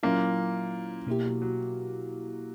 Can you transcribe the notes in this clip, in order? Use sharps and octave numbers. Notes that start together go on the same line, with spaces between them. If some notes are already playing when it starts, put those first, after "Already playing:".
A#2 F#3 A#3 C#4 E4
B2 A#3 E4 G4
F#3
F#3